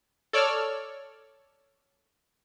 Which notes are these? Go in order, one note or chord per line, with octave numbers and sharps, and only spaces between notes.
A4 C#5 D5 E6 F6